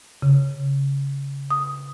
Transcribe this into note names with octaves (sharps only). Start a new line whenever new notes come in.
C#3
D#6